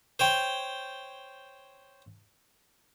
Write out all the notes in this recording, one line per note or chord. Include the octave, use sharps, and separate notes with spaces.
C5 C#5 G5